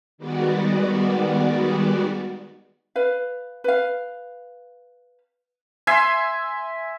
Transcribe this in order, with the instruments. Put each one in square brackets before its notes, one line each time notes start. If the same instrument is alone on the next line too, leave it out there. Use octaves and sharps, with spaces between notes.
[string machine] D#3 G3 G#3 B3 F#4 D5
[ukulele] B4 F5
B4 F5
[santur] E5 G#5 C6